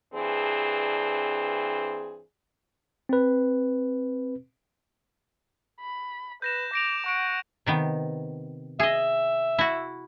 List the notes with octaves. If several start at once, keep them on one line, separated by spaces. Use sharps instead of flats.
G2 E3 C4 D4 G#4
C4 B4
B5
B4 G6 A#6 E7
D6 A#6 D7 F7
F#5 C#6 D7
C3 D#3 B3
G#4 D#5 E5
E4 F#4